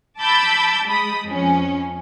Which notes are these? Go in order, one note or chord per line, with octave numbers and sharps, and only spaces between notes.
A5 B5 D6 E6 G6 A6
G#3 B5 D#6
F2 F3 C#4